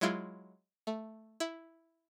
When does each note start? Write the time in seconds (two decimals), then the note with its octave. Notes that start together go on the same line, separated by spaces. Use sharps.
0.01 F#3 G#3 E4 F4
0.87 A3
1.40 E4